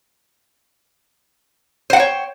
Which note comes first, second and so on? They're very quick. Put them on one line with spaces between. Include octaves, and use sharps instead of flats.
C5 F#5 G5 C#5